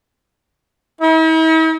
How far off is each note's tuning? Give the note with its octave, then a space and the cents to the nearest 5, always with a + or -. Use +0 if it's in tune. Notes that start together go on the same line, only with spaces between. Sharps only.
E4 -45